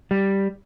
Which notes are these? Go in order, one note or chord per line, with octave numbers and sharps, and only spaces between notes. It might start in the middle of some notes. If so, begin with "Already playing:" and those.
G3